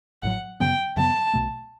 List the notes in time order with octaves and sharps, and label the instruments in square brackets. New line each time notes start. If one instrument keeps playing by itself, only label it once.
[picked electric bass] A1 A2 F#3 [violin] F#5
[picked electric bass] F#2 C#3 F#3 B3 [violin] G5
[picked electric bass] F#2 C#3 F#3 B3 [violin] A5
[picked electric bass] B1 B2 A3